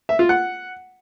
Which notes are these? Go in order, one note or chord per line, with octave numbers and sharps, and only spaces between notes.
E5
F4
F#5